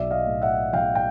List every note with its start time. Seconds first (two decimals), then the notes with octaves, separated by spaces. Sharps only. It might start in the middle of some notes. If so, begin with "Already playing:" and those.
Already playing: B1 D5 E5
0.11 D#5 F5
0.27 A2
0.42 E5 F#5
0.73 B1 F5 G5
0.95 G5